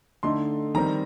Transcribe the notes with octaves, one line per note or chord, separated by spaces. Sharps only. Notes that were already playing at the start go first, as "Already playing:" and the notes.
D3 A3 D#4 C6
D#3 G3 C4 A#5